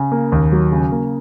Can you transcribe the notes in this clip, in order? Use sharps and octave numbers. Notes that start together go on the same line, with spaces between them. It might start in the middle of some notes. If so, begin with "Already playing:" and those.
Already playing: C#3
A#3
D#2
F#3
C#3
A#3